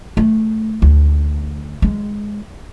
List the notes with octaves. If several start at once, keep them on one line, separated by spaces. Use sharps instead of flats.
A3
D2
G#3